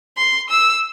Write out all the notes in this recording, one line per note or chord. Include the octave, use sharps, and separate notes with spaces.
C6
E6